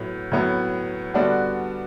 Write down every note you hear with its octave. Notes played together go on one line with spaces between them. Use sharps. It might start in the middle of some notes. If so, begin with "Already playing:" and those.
Already playing: A2 F#3 B3
A2 F#3 B3
D3 G3 B3 D4 F#4